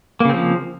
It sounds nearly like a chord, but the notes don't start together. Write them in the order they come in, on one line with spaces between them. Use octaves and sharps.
A#3 C#3 C4 F3